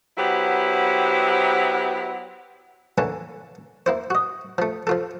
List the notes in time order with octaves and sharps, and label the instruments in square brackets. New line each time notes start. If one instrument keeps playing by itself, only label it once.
[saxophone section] F#3 B3 E4 G4 C5
[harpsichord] D3 E3 A#3 C#4 A4
A#3 E4 C5
F#4 D#5
F3 A3
F3 F4 A4